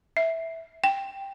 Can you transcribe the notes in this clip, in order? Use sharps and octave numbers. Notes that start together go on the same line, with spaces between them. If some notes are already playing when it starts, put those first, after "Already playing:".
E5
G5